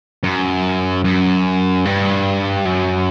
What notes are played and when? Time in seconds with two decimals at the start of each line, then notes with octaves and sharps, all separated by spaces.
0.23 F#2
1.04 F#2
1.85 G2
2.66 F#2